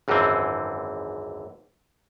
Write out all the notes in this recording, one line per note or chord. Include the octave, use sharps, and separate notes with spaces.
G#1 C#2 F#2 D3 E3 C4